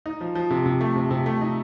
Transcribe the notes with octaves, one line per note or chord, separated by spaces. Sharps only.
D#4
F3
F3
C3
C3
A3
C3
C3
A3
D#4